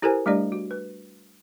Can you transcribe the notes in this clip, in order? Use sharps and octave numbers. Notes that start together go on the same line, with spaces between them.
E4 G4 A4 A#4 C5 G#5
G3 A3 D4 G4 D5
F#4
B4